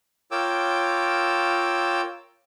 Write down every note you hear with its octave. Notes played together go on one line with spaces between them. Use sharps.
F4 A#4 C#5 G5 D6 E6